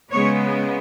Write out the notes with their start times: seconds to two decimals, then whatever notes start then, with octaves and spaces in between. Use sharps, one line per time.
0.11 C#3 G#3 B3 C#5